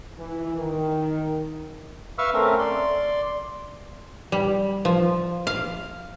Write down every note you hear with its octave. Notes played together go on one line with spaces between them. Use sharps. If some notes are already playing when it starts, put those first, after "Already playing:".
E3
D#3
B4 E5 F5 C#6 E6 F6
A3 C4 C#4 A#4
D5 C6
G3
F3
F5